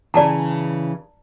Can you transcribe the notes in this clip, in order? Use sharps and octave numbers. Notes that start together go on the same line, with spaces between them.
C#3 E3 D5 A5 A#5